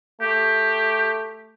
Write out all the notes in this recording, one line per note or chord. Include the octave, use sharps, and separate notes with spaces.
A3 G4